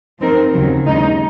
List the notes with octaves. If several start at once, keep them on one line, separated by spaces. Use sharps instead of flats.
F3 C4 D#4 A#4
D#2 C#3 F#3
D#2 C#3 G#3 D#4